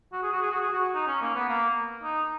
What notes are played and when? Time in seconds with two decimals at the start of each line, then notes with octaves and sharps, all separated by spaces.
0.12 F#4
0.23 G#4
0.33 F#4
0.42 G#4
0.51 F#4
0.61 G#4
0.72 F#4
0.95 D#4
1.07 C#4
1.22 A#3
1.35 B3
1.49 A#3
2.03 D#4